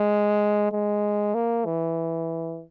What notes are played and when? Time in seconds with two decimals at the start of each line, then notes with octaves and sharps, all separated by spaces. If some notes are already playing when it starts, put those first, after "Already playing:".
Already playing: G#3
0.72 G#3
1.34 A#3
1.66 E3